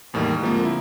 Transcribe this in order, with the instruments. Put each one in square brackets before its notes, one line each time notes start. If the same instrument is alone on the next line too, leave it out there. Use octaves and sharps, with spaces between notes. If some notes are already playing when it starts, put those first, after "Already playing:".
[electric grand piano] E2 A2 D#3 G3 A#3
D3 F3 G#3 A#3 C4
E4